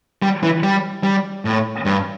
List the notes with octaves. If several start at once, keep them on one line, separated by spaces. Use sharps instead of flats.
G3
E3
G3
G3
A2
G2